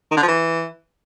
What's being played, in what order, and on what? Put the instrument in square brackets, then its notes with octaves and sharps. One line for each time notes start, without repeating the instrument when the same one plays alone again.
[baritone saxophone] D#3
D3
F3
E3